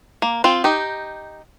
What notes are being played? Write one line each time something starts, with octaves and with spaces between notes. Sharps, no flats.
A#3
C4 F4
D#4 G4